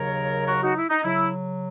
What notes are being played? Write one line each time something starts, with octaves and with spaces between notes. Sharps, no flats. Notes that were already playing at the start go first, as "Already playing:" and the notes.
Already playing: D#2 C#3 F#3 A#4 C#5
F#4 A#4
D#4 F#4
E4
D#4
C#3 F#3 E4